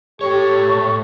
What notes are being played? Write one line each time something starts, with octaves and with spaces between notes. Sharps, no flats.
A2 G4 A4 C#5 C#6